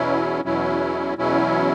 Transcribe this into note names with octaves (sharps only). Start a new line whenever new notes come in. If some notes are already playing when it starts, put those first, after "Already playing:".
Already playing: E2 B2 F#3 C#4 E4
E2 B2 F#3 C#4 E4
E2 B2 F#3 C#4 E4